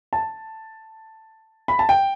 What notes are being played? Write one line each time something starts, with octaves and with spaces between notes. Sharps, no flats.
A5
B5
A5
G5